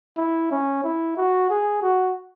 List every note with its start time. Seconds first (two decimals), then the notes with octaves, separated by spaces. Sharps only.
0.17 E4
0.51 C#4
0.84 E4
1.17 F#4
1.50 G#4
1.82 F#4